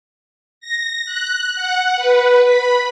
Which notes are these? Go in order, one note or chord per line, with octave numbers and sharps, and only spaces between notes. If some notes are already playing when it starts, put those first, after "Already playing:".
A#6
F#6
F#5
B4
B5